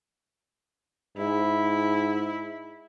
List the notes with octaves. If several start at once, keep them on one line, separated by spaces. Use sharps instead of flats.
G#2 E4